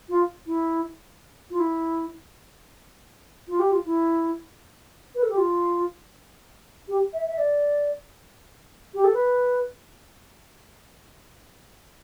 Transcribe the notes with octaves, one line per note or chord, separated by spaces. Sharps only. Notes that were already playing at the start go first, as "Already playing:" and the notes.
F4
E4
F4
E4
F4
G4
F4
E4
B4
A4
G4
F4
G4
E5
E5
D5
G4
A4
B4